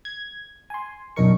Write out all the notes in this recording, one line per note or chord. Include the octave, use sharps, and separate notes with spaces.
G#6
G#5 C6
B1 F#2 D4 D#4 A#4 C#6